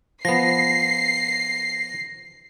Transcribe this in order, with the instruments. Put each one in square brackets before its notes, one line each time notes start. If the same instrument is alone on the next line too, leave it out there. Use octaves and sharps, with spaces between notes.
[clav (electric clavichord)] F3 B3 [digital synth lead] A#6 [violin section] C7